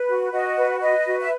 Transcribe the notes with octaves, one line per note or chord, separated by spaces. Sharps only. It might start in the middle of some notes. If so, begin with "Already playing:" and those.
Already playing: B4
F#4
F#4 D#5
B4
B4 D#5
F#4
E5